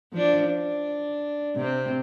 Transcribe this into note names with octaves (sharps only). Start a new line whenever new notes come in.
F3 D4
D4
C3 C4